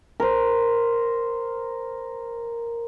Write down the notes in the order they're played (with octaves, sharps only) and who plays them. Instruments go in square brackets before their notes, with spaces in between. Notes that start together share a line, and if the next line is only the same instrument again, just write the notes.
[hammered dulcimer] A#4 C5